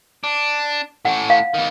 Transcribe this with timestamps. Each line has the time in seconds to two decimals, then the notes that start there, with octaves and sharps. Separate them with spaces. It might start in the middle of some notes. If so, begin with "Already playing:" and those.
0.24 D4
1.05 A2 C#4 F#5
1.30 F5
1.54 D#3 B3